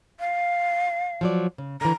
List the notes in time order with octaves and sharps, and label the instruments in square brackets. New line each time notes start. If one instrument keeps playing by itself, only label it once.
[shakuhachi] F5
[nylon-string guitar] F3 F#3 D5
C#3
[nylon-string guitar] D3 E3 [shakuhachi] A#5